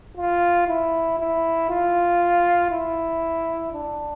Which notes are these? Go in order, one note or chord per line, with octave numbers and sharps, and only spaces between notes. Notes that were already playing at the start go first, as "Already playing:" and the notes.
F4
E4
E4
F4
E4
D4